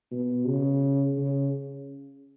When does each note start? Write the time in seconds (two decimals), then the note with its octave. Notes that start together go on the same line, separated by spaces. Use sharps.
0.11 B2
0.46 C#3
1.18 C#3